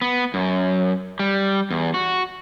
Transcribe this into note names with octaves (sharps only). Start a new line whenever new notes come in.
B3
F#2
G3
E2
F#4